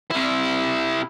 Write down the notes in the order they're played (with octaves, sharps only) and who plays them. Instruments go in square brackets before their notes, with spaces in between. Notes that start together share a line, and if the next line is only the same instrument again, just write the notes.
[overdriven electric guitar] C3 E4